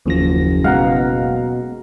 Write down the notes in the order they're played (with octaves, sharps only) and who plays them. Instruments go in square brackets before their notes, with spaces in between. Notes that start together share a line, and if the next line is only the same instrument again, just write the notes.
[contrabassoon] F#1 [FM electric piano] D#2 F3 A#6
[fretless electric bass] B2 G#3 [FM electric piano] F5 F#5 A#5